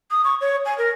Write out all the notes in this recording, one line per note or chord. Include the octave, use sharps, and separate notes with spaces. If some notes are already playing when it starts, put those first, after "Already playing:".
D#6
C#6
C#5
G#5
A#4